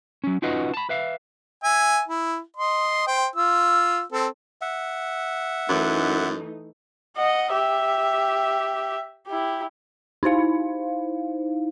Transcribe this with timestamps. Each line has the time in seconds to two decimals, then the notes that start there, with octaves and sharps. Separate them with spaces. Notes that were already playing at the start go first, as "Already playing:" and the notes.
0.24 F#3 C#4
0.42 C#4 D#4 F4 F#4 B4 D#5
0.74 A5 B5
0.89 B4 E5 F5
1.64 E5 G#5
2.08 E4
2.57 D#5 C6
3.07 C5 G5
3.36 F4 E6
4.12 C4 A4
4.61 E5 F#5
5.69 F#2 E3 A3 D#4
7.16 D#5 F#5
7.52 G4 E5
9.27 E4 G4
10.23 D#4 E4 C5 F5